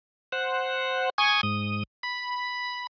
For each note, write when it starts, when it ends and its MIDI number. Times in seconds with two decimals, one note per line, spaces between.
0.32 1.10 72
0.32 1.10 78
1.18 1.41 80
1.18 1.41 85
1.18 1.41 87
1.18 1.41 92
1.43 1.83 44
1.43 1.83 87
2.03 2.87 83